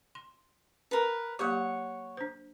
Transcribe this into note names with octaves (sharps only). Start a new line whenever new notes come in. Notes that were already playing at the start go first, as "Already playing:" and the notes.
C6
A#4 B4
F#3 A#3 G4 C#5 F#5
D4 C5